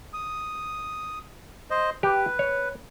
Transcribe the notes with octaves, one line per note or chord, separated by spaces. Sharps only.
D#6
C5 D#5
G4 B4
C#5